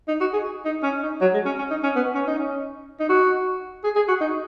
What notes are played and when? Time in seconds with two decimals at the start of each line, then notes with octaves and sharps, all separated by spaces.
0.08 D#4
0.20 F#4
0.33 G#4
0.65 D#4
0.83 C#4
1.03 D#4
1.21 F#3
1.34 G#3
1.45 C#4
1.58 C#4
1.70 D#4
1.83 C#4
1.96 B3
2.14 C#4
2.27 D#4
2.39 C#4
3.00 D#4
3.09 F#4
3.84 G#4
3.96 G#4
4.08 F#4
4.21 D#4